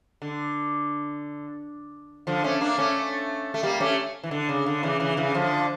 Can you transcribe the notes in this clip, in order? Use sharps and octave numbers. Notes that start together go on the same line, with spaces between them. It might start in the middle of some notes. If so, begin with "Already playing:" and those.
D3
D3 F3
A3 C#4
A#3 D4
A3 C#4
A3
G3 A#3
A3 C#4
E3
D3
C#3
D3
C#3 E3
C#3 E3
C#3 E3
D3 F3